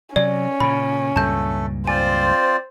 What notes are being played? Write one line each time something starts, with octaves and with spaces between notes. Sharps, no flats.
C3 F#3 C#4 D5
A#2 C#3 B5
C#2 G2 A#2 A3 A4 A5 G6
C4 F4 C5 D5 G#5